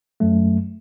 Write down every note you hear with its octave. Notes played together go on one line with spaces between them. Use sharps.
F#2 F#3 A3